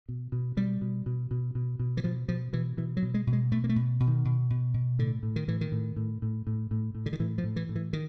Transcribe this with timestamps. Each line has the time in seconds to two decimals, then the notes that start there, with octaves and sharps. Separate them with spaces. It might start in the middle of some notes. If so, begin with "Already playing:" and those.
0.09 B2
0.32 B2
0.57 B2 G3
0.81 B2
1.06 B2
1.31 B2
1.55 B2
1.79 B2
1.97 E3
2.04 B2 F3
2.28 B2 F3
2.53 B2 E3
2.77 B2 E3
2.97 F#3
3.03 B2
3.14 G#3
3.27 B2
3.33 G#3
3.52 B2 A3
3.64 A#3
3.69 A3
3.76 B2
4.00 B2
4.07 D#3
4.25 B2
4.50 B2
4.74 B2
4.99 A2 D3
5.23 A2
5.36 D#3
5.48 A2 E3
5.61 D#3
5.72 A2
5.96 A2
6.22 A2
6.47 A2
6.71 A2
6.95 A2
7.06 D3
7.13 D#3
7.19 A2 E3
7.38 F3
7.44 A2
7.56 E3
7.69 A2
7.76 E3
7.93 D#3